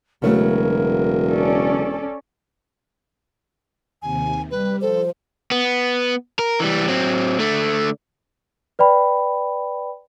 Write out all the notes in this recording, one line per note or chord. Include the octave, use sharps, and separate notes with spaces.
E1 C#3 F#3 A3 A#4
C#4 A4 D5
D#2 C3 G#5
G3 B4
F3 A4 C5
B3
A#4
E3 G3
F#3 C4
D3 A3
B4 D5 G5 B5